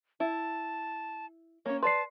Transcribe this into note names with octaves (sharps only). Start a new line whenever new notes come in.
E4 A5
A#3 C#4 C#5
B4 D5 A5 C6 C7